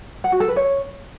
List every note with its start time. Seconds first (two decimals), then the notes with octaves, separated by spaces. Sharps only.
0.24 F#5
0.32 F#4
0.40 A4
0.48 B4
0.56 C#5